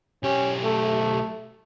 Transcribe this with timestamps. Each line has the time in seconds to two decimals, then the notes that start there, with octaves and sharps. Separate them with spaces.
0.23 B1 C#4 G4
0.64 A3